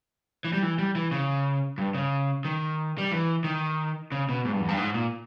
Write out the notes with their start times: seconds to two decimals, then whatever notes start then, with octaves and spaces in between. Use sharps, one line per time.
0.44 E3
0.53 G3
0.63 E3
0.79 G3
0.95 E3
1.11 C#3
1.78 G2
1.95 C#3
2.45 D#3
2.98 G3
3.12 E3
3.44 D#3
4.12 C#3
4.29 B2
4.45 G#2
4.52 G2
4.60 E2
4.68 G2
4.78 G#2
4.94 A#2